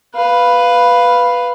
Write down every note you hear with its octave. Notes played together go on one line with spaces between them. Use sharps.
B4 F5